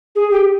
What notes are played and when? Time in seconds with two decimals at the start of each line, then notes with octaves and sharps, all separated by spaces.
0.15 G#4
0.31 G4